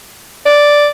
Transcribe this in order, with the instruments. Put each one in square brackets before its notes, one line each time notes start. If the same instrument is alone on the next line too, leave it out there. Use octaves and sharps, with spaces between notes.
[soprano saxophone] D5